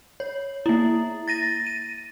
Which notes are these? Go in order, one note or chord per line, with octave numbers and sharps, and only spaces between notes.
C#5
A#3 E4
A6 A#6 D#7
D#7